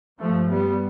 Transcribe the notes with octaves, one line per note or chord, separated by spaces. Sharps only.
G2 F3 A3
G3 B3